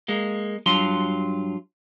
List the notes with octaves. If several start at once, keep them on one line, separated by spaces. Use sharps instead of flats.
G#3 A#3
G2 F#3 F4 C6